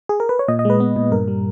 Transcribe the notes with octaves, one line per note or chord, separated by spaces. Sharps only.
G#4
A#4
B4
C#5
A#2 D#5
D#5
G#3 B4
B3
A#2
G2 A#4
G3